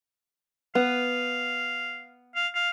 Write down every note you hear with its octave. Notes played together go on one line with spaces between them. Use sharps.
B3 F5
F5
F5